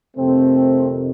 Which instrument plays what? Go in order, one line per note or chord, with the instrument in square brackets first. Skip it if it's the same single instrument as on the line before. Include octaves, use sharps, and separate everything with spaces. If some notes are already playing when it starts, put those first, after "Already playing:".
[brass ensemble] F2 C3 D#3 A3 C4